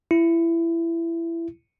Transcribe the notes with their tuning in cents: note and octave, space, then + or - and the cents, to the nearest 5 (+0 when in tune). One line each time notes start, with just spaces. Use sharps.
E4 +20